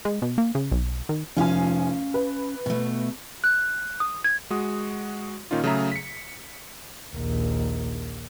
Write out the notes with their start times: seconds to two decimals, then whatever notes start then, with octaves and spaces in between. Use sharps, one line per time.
0.05 G#3
0.22 B2
0.38 A#3
0.55 C#3
0.72 B1
1.09 D#3
1.37 F1 F3 C#4 F5 G#5
2.14 B4
2.66 B2 A3
3.44 F#6
4.00 D#6
4.24 G#6
4.50 G#3 F#4 D#6
5.51 A#2 D#3 C#4 D#4 F4
5.64 C#3 F#3 A3 G#4 E5 A#5
5.92 B6 C#7
7.13 A#1 D#2